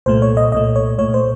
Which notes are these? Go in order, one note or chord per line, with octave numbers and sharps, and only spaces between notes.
C2 A#2 A3 C5
C#5
D#5
C2 A#2 A3 D#5
C#5
C2 A#2 A3 C#5
C5